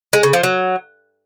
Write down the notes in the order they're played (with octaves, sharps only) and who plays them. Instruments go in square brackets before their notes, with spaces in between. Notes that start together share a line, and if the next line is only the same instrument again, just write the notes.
[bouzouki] G#3
C#3
F3
F#3